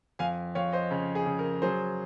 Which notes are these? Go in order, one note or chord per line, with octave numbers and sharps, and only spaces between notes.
F2 F5 G#5
F2 C#5 F5
C5 D#5
C#3
G#4
C#3
A#4
F#3 G#4 C5